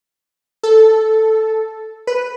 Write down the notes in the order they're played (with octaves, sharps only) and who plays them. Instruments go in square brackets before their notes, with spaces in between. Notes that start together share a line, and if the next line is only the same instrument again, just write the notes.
[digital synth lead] A4
B4